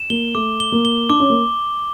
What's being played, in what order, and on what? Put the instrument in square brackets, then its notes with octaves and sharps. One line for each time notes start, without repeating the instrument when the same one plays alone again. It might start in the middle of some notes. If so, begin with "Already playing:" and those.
Already playing: [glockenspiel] E7
[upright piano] A#3 [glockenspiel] G7
[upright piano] A3 [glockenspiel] D6
[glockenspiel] G7
[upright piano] A#3
[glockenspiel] G7
[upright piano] D4 [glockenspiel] D6
[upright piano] C#4
A#3